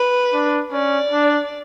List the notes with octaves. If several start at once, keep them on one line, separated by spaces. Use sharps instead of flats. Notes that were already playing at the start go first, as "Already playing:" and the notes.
Already playing: B4
D4
C#4 D5
D4